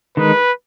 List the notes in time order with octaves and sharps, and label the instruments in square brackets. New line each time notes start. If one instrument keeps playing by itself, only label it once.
[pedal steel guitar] D#3 G#3 D#4 [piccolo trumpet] B4